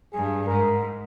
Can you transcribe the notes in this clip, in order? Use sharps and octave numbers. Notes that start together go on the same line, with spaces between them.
G2 G#4
G#2 A#4